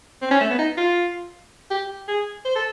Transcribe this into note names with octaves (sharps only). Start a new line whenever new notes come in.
C4
C#4
A3
B3
D#4
F4
G4
G#4
C5
A4